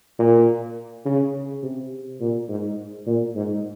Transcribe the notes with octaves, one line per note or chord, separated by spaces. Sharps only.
A#2
C#3
C3
A#2
G#2
A#2
G#2